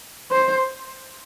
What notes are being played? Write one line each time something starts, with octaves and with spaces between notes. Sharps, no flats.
C5